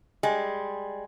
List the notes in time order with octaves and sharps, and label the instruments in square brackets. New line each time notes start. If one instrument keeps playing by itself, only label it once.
[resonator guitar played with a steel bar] G3 G#3